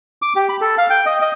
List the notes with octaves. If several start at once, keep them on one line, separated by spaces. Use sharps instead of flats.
D6
G4
B5
A4
F5
G5
D#5
D#5